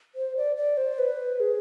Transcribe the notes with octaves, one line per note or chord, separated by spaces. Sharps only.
C5
D5
D5
C5
B4
G#4